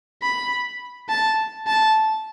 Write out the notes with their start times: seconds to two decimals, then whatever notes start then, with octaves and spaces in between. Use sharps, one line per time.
0.22 B5
1.09 A5
1.67 A5